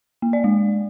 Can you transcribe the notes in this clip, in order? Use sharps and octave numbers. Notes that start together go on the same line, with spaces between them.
A#3
D5
G#3